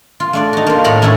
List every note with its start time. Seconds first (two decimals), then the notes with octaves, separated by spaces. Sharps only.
0.20 F4
0.33 A3 D4 D5
0.53 D#4 F#4
0.66 A#3 F4
0.84 A2 A3 A4 F#5 A#5 B5
1.02 A3 C#4 D4 E4 A4